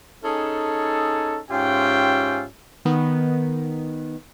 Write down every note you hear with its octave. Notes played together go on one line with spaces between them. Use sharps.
C#4 D#4 G#4 A4
G#2 C#4 F4 G4 E5 G5
D#3 B3